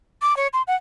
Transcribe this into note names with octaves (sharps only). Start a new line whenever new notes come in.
D6
C#5
C6
F#5